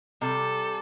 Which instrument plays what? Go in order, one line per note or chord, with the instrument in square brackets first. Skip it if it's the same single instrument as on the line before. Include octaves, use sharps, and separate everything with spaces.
[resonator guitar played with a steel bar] C3 G3 [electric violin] A4